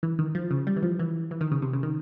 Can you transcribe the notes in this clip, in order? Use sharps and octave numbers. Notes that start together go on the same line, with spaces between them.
E3
D#3
F3
C#3
G3
E3
F3
E3
E3
D#3
C#3
C3
C#3
D#3